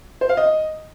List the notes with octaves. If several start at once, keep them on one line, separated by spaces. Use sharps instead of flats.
C5
F5
D#5